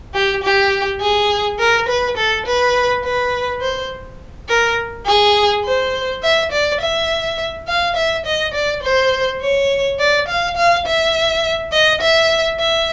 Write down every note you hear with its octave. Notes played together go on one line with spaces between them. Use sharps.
G4
G4
G#4
A#4
B4
A4
B4
B4
C5
A#4
G#4
C5
E5
D5
E5
F5
E5
D#5
D5
C5
C#5
D5
F5
F5
E5
D#5
E5
E5